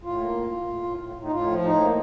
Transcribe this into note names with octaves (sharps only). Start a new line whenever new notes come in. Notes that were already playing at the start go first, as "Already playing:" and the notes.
A2 F4
A#3
A2
A2
A2
A2
A2
A2
D#4
A2 F4
F3
A2 D#4
A#3